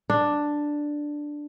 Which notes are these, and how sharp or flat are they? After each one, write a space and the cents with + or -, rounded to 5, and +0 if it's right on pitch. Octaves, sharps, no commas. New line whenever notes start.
D4 +5